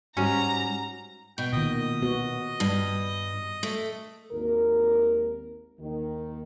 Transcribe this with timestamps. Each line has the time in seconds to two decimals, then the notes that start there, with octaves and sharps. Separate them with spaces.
0.17 G#2 G3 C#4 F#4 A#5
1.38 B2 G5
1.53 A#2 D#3 D#5
2.02 B3 F#4
2.60 G2
3.63 A3
4.32 G#1 D#2 A#4
5.80 D#2 D#3